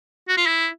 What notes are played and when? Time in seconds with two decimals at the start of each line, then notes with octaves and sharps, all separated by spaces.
0.29 F#4
0.37 F4
0.47 E4